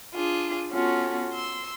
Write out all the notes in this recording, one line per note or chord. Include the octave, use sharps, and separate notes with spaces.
D4 F4 G#4
B3 C#4 F4 F#4 A4
C6 E6